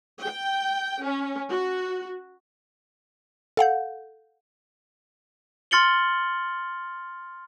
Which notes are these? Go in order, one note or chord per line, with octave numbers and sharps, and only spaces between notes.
G5
C#4
F#4
A4 F5 F#5 G6
C6 F6 A6 C#7 F#7 G7